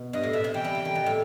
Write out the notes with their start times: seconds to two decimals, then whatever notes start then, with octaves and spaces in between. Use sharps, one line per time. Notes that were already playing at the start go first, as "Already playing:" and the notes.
Already playing: B2
0.13 G2 D#5
0.23 A2
0.33 B2 E5
0.44 C3
0.54 E3 G5
0.65 G3
0.75 E3
0.85 D#3
0.95 B2
1.06 A2